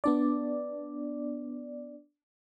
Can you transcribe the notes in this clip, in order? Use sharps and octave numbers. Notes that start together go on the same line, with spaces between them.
B3 D4 D5